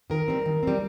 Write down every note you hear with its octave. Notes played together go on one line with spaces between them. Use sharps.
D#3 A#4
G3 C4
D#3
G3 C4